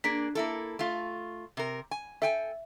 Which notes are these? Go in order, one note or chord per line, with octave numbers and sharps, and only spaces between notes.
A#3 D4 G#4 B6
A#3 E4 A4
A3 F4
C3 A#4
G#5
A4 E5 G5 G#5